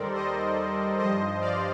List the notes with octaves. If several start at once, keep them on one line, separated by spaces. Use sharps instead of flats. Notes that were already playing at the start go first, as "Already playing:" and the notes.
Already playing: D#2 D#3 G3 A4 A#4 C5 D5
C5 D#5
G2 F3 C5 D#5
D5 F5